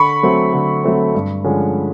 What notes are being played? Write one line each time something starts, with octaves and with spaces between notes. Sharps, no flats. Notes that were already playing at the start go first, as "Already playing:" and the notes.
Already playing: D3 B5 C#6
F#3 A3 C4
D3
F#3 A3 C4
G2
D3 F3 G#3 C#4